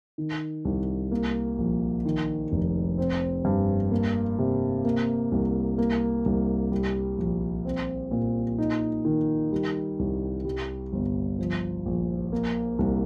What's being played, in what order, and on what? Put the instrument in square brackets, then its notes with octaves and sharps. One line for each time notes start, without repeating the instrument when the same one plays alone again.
[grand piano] D#3
C2
A#3
A#1
D#3
F1
C4
G2
A#3
C3
A#3
C2
A#3
C2
G3
A#1
C4
A#2
D#4
D#3
G3
C2
G3
G1
F3
A#1
A#3
C2